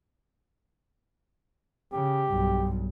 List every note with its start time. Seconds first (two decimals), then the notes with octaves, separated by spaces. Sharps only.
1.93 C#3 G4
2.30 B1 G2